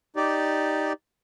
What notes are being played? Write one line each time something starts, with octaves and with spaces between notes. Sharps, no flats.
D#4 G4 D5